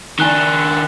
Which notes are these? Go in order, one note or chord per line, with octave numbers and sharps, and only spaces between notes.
D#3 D4 G#5 F#6 G7